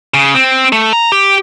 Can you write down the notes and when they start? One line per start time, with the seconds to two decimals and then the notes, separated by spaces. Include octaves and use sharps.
0.14 C#3
0.35 C4
0.72 A3
0.93 A#5
1.12 G4